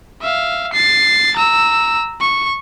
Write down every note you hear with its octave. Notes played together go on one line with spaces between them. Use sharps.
E5 F5
A6 C7
A#5 E6
C#6